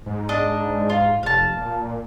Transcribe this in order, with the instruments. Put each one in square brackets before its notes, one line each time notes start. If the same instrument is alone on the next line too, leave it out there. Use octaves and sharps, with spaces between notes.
[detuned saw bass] G#2
[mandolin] D4 D#5
F4
[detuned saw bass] F1 [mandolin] F5 A5
[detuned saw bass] A#2